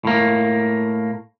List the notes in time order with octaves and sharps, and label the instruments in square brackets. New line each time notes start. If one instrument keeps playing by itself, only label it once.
[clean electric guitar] A2 A#3